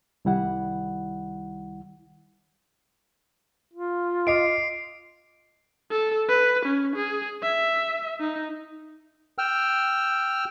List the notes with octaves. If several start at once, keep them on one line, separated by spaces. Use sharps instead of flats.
C2 D#3 G3 E4 F#5
F4
D#5 D6 C7 D7
A4
B4
C#4
G#4
E5
D#4
G5 E6 F6